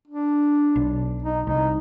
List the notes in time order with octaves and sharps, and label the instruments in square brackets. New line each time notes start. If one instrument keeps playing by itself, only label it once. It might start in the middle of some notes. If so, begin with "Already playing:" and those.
[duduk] D4
[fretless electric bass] B1
[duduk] D#4
[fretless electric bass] C2 [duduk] D#4